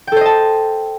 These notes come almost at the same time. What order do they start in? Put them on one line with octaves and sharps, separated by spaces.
G5 A4 C5 D#5 A5